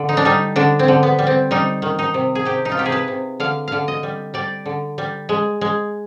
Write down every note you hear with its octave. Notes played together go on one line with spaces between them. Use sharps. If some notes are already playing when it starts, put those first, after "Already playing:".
Already playing: D3
D#4
D4
G3 D#4
D3 D4
C4
D3
B3
G3
C4
G3 D#4
D#3
D#4
C3
G#4
C3 G4
D#4
F4
C3 G4
G#4
B4
C3
D3 F5
D3 F5
D#5
G3
G3 D5
D3
G3
G#3
G#3